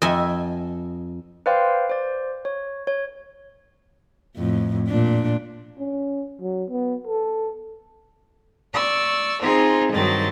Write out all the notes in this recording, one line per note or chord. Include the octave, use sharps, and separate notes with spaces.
F2 D#5 E5 G#5
B4 C5 D5 F5 G5 C6
C5 D5
C#5
C#5
F2 A2
A#2 D4
C#4
F#3
B3
A4
D5 C#6 E6
C4 D#4 F4 G#4 C5
G2 D#3 F#3 C4 D#5 A6